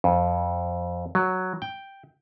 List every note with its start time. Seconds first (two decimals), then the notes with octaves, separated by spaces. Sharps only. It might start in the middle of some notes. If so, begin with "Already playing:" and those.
0.04 F2
1.15 F#3
1.62 G5